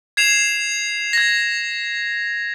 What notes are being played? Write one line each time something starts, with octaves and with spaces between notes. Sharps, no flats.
G#6 C7 E7 F7
G#6 A#6